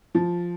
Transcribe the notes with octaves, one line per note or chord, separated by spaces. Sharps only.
F3